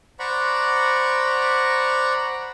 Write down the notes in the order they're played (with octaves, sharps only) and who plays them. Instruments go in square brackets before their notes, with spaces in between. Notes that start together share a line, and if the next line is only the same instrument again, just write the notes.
[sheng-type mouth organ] C5 D5 F#5 A#5 B5 C#6